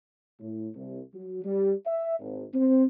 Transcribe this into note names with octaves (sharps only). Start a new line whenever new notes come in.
A2
C2
F#3
G3
E5
G#1
C4